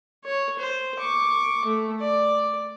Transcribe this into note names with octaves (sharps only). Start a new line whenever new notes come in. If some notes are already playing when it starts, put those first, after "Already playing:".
C#5
C5
C#6 D6
A3
D5